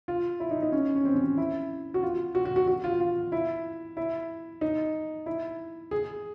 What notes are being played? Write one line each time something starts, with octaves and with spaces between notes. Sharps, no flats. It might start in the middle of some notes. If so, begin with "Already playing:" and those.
F4
E4
D#4
D#4
C#4
C#4
C4
C#4
E4
F#4
F4
F#4
F#4
F#4
F#4
F4
F4
E4
E4
D#4
E4
G#4